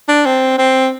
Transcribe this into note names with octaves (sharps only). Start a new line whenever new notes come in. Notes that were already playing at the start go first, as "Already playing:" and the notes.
D4
C4
C4